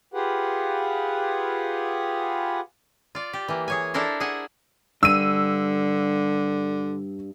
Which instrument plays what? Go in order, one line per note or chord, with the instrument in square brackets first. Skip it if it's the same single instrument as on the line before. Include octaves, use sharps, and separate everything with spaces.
[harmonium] F4 G4 G#4 B4 F#5
[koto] F4 D5
G4
E3 A#3
G#4 C#5 G#5
D4 E4 A4 A#4 C5
G#4 E5 F#5 G#5
[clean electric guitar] G2 [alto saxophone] D3 [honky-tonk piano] E6 D#7